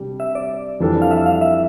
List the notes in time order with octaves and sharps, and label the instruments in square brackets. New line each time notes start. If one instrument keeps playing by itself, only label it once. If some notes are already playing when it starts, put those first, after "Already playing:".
Already playing: [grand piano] C3 G3 D4 G4
[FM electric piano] E5
D5
[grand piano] F2 E3 G3 D4 A4
[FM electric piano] F5
E5
F5
E5